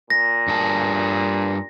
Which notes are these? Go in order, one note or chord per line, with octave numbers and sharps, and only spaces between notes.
A#2 A#6
G2 G#4 A5